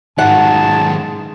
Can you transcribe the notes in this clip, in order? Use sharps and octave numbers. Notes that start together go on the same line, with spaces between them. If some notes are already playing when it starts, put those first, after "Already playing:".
G#2 D#3 F#3 F#5 A5